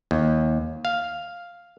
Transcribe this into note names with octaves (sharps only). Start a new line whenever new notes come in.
D#2
F5